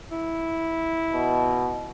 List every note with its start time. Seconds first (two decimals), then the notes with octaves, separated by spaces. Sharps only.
0.12 E4
1.12 B2